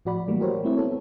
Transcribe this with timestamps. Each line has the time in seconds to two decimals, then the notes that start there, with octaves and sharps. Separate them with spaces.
0.05 A2 F3 F#4 D5 B5
0.28 E3 F#3 G3 A3 A#3
0.40 F#4 G4 A#4 C5 C#5
0.63 A3 C4 E4
0.77 B3 A4 C#5